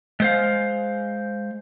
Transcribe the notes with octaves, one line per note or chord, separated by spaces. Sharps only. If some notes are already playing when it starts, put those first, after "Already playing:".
G#3 C5 F5